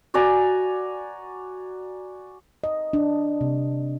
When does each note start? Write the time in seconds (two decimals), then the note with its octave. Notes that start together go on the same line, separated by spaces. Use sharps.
0.14 F#4 D5 G#5 A#5
2.64 D#5
2.93 D4
3.41 C3